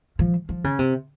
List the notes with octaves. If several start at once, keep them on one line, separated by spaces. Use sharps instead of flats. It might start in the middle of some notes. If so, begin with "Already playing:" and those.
F3
F3
C#3
C3